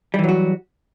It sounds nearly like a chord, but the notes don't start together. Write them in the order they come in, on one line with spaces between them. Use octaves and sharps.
G3 E3 F#3 F#4